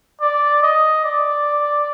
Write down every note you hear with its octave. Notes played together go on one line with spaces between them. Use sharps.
D5
D#5
D5